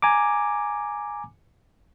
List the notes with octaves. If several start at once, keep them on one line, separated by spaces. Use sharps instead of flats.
G#5 A#5 D6